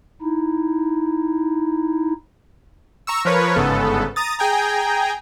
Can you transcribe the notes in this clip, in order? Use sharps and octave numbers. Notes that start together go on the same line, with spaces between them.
D#4 E4
A#5 C#6 E6
F3 A#4 B4 C#5
G1 G#2 C#3 B3 A4
A#5 D#6 A6
G#4 G5 G#5 A#5